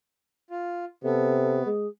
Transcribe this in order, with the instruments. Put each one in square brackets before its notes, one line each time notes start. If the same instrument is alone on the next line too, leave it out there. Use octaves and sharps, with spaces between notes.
[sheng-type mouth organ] F4
[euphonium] C3 [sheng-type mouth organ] B3 [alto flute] A4
[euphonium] G#3 [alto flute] G#4